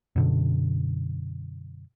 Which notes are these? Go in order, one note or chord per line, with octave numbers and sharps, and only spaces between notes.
F#2 B2 D3